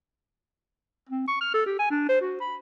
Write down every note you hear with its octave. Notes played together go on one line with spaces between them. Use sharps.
C4
C#6
F6
A4
G4
G#5
D4
C5
F#4
B5